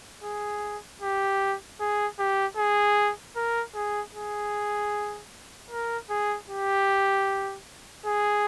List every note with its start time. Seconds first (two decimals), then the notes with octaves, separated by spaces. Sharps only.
0.24 G#4
1.01 G4
1.80 G#4
2.19 G4
2.57 G#4
3.36 A#4
3.74 G#4
4.14 G#4
5.70 A#4
6.10 G#4
6.49 G4
8.05 G#4